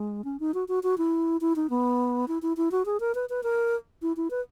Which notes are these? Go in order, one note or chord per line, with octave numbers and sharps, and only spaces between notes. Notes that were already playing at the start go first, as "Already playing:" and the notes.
Already playing: G#3
C#4
D#4
F#4
F#4
F#4
E4
E4
D#4
B3
E4
E4
E4
F#4
G#4
A#4
B4
B4
A#4
E4
E4
B4